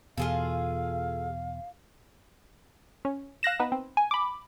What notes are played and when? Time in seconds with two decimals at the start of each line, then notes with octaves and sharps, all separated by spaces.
0.17 E2 B2 F4 G#4 A4 F5
3.05 C#4
3.43 F5 F#6 A#6 E7
3.60 B3 D#4 B4
3.72 C4
3.97 G#5
4.11 B5 D6